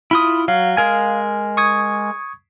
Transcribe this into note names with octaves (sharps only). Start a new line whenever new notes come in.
E4 F4 B5 D#6
F#3 F5
G#3 A#4 G#5
C#6 D#6 G#6